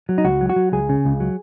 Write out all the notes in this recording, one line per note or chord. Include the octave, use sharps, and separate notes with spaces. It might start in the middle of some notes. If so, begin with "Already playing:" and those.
F#3
D#4
C#2 F#4
F#3
F#4
F#3
C#2 G#4
C#3
C#2
F#3